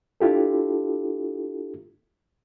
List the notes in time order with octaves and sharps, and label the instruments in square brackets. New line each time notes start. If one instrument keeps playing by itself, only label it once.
[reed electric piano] D4 E4 F4 G4 A4